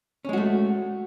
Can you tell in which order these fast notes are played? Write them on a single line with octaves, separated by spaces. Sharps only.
C#4 G#3 F#4 A3